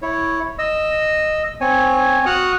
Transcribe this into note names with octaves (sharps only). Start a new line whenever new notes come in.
E4 C#5
D#5 E6
C4 C#5 G#5
F#4 F#5 D#6 F6 F#6